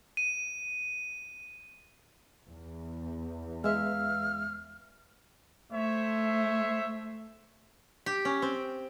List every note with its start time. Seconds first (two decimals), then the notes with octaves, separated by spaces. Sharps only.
0.17 D#7
2.48 E2
3.64 G#3 B4 E5 F5 E6 F6
5.73 A3 C5 C#5 E5
8.06 G4
8.25 C#4
8.42 C4